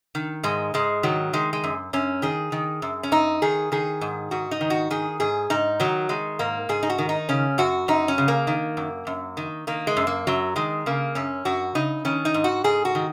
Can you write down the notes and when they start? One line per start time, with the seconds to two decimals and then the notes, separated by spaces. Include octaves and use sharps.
0.15 D#3
0.43 G#2 G#3
0.74 G#2 G#3
1.03 D#3 F#3
1.33 D#3 G#3
1.53 G#3
1.64 F#2
1.93 F#2 C#4
2.22 D#3 G#4
2.52 D#3
2.82 F#2
3.03 C#4
3.12 F#2 D#4
3.42 D#3 G#4
3.72 D#3 G#4
4.01 G#2
4.31 G#2 F#4
4.51 D#4
4.61 D#3
4.70 F#4
4.91 D#3 G#4
5.20 G#2 G#4
5.50 G#2 D#4
5.80 D#3 F#3
6.09 D#3 G#3
6.39 G#2 A#3
6.69 G#2 G#4
6.83 D#4
6.90 F#4
6.98 D#3
7.09 D#4
7.29 C#3 C#4
7.58 F#2 F#4
7.88 F#2 D#4
8.08 C#4
8.18 C#3
8.28 A#3
8.47 D#3
8.77 F#2
9.07 F#2
9.37 D#3
9.67 D#3 A#3
9.87 G#3
9.97 F#2
10.07 A#3
10.27 F#2 F#3
10.56 D#3 G#3
10.86 C#3 A#3
11.15 F#2 C#4
11.45 F#2 F#4
11.75 C#3 D#4
12.05 D#3 C#4
12.25 D#4
12.34 G#2
12.44 F#4
12.64 G#2 G#4
12.85 F#4
12.95 D#3